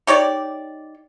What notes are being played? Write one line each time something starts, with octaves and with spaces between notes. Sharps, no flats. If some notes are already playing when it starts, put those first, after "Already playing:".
D#4 G4 C#5 D5